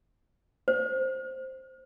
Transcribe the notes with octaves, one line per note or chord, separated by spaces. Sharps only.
C5